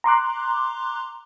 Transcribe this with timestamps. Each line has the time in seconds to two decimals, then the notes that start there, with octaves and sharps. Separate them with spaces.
0.04 A#5 C6 D6 F#6